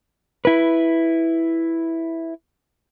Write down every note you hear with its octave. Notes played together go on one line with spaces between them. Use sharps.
E4 B4